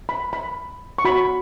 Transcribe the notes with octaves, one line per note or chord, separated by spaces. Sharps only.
B5
B5
C#6
F#4 C#5 B5